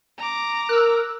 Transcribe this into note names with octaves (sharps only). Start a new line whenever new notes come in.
A#5 D6
A#4 E6 F#6